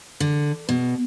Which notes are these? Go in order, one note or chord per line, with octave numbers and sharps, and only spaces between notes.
D3
B2